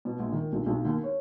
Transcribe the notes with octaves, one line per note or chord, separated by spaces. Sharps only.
B2
A#1
D#3
B1
B1
D#2
C#5